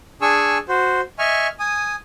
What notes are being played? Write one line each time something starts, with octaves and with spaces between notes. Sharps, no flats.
D4 G#4 G#5 C#6 E6
F#4 C5
D#5 E5 G#5 C#6 F6
G#5 D#6